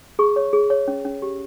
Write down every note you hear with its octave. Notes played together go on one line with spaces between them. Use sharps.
G#4 C#6
C#5
G#4
C#5
C#4
C#4
G4